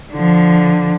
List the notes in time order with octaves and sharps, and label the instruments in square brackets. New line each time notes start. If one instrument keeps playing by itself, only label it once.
[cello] D3 F3